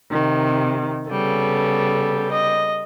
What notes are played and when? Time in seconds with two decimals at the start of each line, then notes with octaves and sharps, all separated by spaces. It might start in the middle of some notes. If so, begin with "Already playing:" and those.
0.10 C3 D#3
1.09 C#3 G3 B3 A4
2.31 D#5